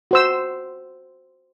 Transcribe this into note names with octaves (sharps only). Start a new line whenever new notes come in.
F#4 C5 E6